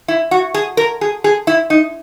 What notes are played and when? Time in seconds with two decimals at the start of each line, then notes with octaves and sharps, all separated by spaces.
0.08 E4
0.31 F#4
0.54 G#4
0.77 A#4
1.01 G#4
1.24 G#4
1.47 E4
1.70 D#4